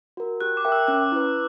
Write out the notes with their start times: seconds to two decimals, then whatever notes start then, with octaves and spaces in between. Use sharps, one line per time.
0.17 F#4 A#4
0.41 G4 F#6
0.57 D6
0.64 A#4 E5 G5
0.72 E6
0.88 C#4 F#6
1.12 E4 B4